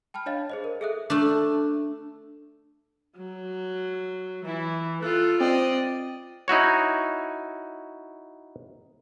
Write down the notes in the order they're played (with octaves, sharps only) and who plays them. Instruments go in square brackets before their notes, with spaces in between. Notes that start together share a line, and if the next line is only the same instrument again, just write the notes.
[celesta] G5 A5 B5 F6
D4 C#5 D#5 F5 A6
G#4 C5 D#5
A#4
G#4 A4 E5 D#6 F#6
[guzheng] A3 D4
[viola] F#3
[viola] E3 [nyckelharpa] E4
[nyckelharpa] F4 [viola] A4 [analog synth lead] F#6
[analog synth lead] C4 [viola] D5 D#5
[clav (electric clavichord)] D#4 E4 F#4 C#5